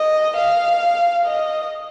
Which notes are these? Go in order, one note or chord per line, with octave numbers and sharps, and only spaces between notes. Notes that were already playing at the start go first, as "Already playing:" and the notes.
Already playing: D#5
F5
D#5